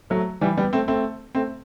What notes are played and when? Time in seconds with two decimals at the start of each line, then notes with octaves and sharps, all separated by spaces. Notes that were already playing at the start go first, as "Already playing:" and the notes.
0.10 F#3 A3
0.41 E3 G3
0.57 G3 B3
0.73 A3 C4
0.88 A3 C4
1.35 A3 C4